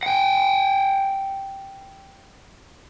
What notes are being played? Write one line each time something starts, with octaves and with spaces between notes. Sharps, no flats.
F#5 G5